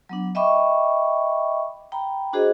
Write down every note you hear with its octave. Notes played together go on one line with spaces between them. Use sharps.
F#3 B3 D4
D#5 E5 G5 B5 C#6 D6
G5 A#5 B5
D4 F#4 G#4 C5 D#5